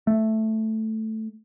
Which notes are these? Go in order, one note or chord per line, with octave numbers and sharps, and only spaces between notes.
A3